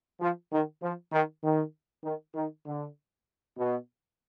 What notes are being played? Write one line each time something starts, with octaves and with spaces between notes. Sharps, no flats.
F3
D#3
F3
D#3
D#3
D#3
D#3
D3
B2